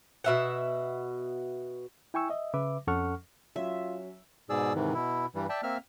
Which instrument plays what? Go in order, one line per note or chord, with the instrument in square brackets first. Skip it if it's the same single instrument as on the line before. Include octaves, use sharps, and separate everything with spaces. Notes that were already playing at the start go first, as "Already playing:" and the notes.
[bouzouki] B2 E5 F#5
[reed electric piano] E4 G5 G#5 C#6 E6
D#5 E5
C#3 B4 E5 D6
F2 C#4 A4 F#5 C#6 F6
[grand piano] F#3 C#4 [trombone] F4 [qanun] E5
[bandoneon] G#2 B2 G#4 D5 E6
G#2 C3 D#3 E3
B2 E4
G2 E3 G3
D5 E5 G5 A5
A#3 C4 E5 F6